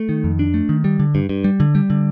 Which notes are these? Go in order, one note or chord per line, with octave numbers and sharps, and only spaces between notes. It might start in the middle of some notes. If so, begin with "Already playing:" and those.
Already playing: A3
D#3
F2
D4
A3
D#3
G3
D3
G2
G2
G3
D3
G3
D3